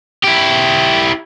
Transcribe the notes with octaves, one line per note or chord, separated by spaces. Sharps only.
E4 G4